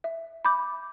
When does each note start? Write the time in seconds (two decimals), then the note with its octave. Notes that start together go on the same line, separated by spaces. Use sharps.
0.04 E5
0.45 B5 D6 G6